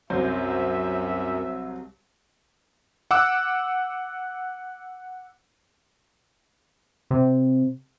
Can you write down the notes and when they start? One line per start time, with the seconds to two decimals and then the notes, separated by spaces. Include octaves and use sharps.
0.10 C2 F#2 F#3 C5 E5
3.11 F#5 D6 E6 F#6
7.11 C3